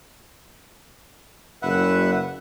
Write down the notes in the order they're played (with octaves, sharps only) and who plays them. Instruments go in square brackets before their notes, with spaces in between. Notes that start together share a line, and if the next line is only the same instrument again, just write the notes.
[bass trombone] F#1 [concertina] B4 E5 F#5